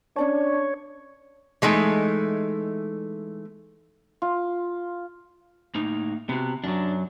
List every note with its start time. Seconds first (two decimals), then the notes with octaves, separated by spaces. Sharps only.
0.16 C#4 D4 C#5 D5 A5
1.62 E3 G#3 A3 D#4
4.22 F4
5.75 A2 A#3 D#4
6.29 C3 B3 F#4
6.64 F#2 F#3 D4